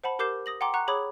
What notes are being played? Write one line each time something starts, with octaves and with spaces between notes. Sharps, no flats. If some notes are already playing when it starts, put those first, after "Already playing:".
C5 F#5 A5 B5
G4 A#4 D6 G6 C7 E7
D#6 A#6 F#7
F#5 G5 A#5 C6 D6
F#5 A#5 C#6 F#6
G#4 C#5 B5 D6 D#6 G#6